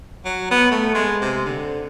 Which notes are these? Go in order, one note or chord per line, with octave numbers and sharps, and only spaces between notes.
F#3
B3
A3
G#3
C3
D3